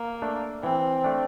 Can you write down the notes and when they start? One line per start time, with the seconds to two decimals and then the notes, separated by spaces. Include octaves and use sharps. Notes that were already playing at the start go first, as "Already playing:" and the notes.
Already playing: A#3
0.22 A3 D4
0.63 E3 C4
1.04 A3 D4